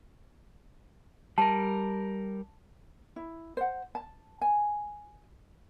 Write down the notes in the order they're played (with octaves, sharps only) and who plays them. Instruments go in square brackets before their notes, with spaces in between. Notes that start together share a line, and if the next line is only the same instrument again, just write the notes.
[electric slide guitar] G3 A#4 [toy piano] A5
[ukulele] E4
C5 F#5
A5
G#5